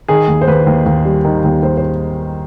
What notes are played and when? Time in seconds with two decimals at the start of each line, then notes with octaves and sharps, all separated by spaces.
0.08 D#3 G#4
0.28 D#2
0.41 C5
0.47 D#2 B4
0.67 D#2
0.86 D#2
1.05 G3
1.25 D#3
1.44 D#2
1.63 D#2 C5
1.77 C5